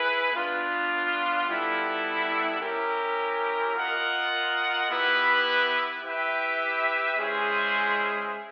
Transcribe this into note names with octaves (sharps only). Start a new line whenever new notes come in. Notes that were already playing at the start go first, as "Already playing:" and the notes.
Already playing: E4 G#4 B4
B3 D4 F4
G3 B3 E4 A4
C#4 E4 G4 A#4
F4 A#4 D#5 F#5
B3 E4 G4 B4
E4 G4 B4 E5 G5
G#3 C#4 E4 G#4 C5